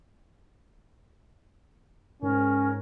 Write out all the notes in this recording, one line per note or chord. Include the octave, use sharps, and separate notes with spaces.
G#2 C#4 A#4